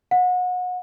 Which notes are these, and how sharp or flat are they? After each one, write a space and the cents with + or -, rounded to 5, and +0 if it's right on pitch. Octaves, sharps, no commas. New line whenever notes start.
F#5 -30